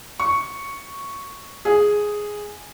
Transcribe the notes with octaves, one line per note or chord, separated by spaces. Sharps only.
C#6
G#4